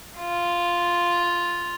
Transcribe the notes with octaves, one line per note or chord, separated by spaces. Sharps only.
F4